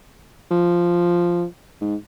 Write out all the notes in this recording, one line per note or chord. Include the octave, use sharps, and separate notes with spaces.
F3
G#2